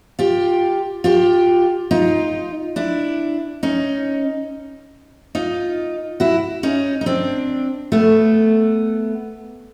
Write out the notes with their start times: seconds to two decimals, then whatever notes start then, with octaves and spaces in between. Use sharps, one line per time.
0.19 F4 G4
1.04 F4 G4
1.91 D#4 F4
2.76 D4 E4
3.63 C#4 D#4
5.35 D#4 F4
6.20 E4 F#4
6.63 C#4 D#4
7.01 D#4
7.06 C4 D4
7.92 A3 B3